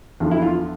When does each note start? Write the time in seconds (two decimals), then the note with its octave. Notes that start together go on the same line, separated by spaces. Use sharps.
0.20 E2 D3 F3
0.31 E4
0.42 F4